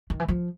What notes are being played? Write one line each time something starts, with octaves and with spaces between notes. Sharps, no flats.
D#3
E3
F3